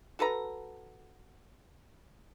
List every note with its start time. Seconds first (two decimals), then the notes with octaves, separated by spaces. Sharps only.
0.19 F#4 A4 B4 A#5